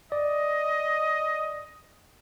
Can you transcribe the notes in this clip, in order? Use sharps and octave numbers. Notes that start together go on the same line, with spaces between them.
D5 D#5